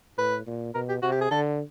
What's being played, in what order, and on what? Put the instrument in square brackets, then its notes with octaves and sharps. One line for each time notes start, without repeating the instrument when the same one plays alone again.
[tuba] A2 [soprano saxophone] B4
[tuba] A#2
[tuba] B2 [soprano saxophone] A#4
[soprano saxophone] G4
[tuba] C3 [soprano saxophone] F#4
[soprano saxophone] G4
G#4
[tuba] D3 [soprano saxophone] A4